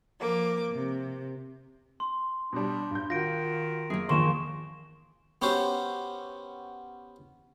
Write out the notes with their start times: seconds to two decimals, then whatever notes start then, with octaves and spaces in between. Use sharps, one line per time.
0.21 F3 A#3 D6
0.72 C3
2.00 C6
2.53 B2 G3 D4
2.91 G2 G6
3.10 D#3 F4 F#4 A#6 D7
3.90 F#2 A#3 G#4
4.09 E2 D#3 F3 A#3 C6 C#6 E7
5.42 B3 C#4 F#4 G4 C5